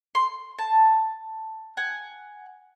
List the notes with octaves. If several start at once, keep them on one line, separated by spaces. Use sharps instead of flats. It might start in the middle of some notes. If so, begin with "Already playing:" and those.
C6
A5
F#5 G#5